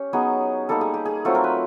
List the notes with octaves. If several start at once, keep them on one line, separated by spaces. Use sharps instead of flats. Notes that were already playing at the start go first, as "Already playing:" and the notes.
Already playing: C#4 G4
F#3 B3 D#4 G#4
G3 A#3 D#4 A4
G#4
G4
G#4
F#3 A3 C4 F4 A4
A#4
B4